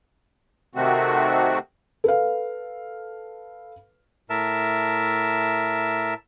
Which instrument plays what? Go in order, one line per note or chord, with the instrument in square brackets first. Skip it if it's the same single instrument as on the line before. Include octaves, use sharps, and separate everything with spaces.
[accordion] C3 D#3 A3 C4 F#4
[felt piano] A4 B4 F5
[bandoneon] A2 A#4 E5 A5